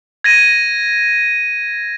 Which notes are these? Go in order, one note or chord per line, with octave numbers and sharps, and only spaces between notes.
G#6 A#6 D#7